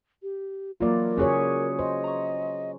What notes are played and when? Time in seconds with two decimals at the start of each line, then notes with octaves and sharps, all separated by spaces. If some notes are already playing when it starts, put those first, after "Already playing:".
0.23 G4
0.80 E3 F#3 A#3 F4 A#4 D5
1.17 C#3 C#4 F#4 G#4 B4 C#5
1.79 C5 D#5
2.04 A#5 C#6